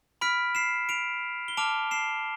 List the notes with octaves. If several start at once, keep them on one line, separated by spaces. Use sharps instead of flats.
B5 F6 B6 D7
C7 E7
D7 F7
G7
A5 D6 F6 D7 F7
C7 E7